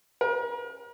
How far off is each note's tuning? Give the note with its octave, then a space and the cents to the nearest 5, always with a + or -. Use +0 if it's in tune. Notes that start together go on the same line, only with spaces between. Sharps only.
A#4 +40